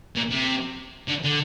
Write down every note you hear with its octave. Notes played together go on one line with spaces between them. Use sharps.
A#2
C3
D3
D3